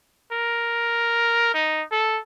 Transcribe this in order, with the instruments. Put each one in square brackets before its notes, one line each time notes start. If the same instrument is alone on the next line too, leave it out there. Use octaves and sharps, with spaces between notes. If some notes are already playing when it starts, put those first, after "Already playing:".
[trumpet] A#4
D#4
A4